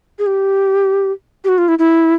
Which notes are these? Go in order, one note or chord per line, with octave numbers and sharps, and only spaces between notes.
G#4
G4
G4
F#4
F4
E4
E4